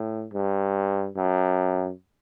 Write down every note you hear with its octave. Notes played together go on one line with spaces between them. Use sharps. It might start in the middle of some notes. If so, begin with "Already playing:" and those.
Already playing: A2
G2
F#2